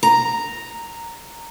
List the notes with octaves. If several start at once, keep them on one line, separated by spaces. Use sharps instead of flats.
A#5